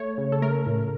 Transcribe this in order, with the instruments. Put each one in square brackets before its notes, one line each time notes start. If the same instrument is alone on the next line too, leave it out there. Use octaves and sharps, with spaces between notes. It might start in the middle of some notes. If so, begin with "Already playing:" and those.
Already playing: [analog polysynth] A3 C#5
C#3
A4
A3 A#4
A2